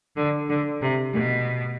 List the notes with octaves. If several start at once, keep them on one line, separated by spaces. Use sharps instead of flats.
D3
D3
C3
B2